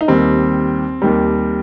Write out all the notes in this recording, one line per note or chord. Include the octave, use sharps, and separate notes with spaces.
D#4
D#2 D#3 G3 C4
D#2 D#3 G3